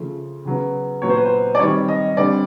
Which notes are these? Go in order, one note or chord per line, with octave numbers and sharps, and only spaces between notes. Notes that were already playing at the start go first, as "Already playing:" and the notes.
Already playing: C#3 F3 A3
C#3 F#3 B3
A#2 F#3 B3 C#5
C5
B4
C5
D5
D#3 G3 C4 C#5
D#5
D3 G3 C4 D5